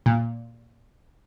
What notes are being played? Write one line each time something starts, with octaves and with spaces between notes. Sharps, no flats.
A#2